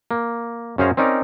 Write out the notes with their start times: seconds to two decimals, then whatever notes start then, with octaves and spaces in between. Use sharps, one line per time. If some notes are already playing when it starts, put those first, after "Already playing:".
0.11 A#3
0.78 F#2 C#4 G#4 C5 F5 A#5
0.97 C4 C#4 D#4 A#4 D5